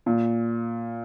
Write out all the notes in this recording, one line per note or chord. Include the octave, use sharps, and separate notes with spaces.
A#2